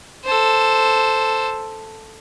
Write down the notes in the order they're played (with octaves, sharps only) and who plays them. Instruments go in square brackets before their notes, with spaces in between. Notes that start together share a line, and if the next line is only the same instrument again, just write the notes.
[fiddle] A4 C5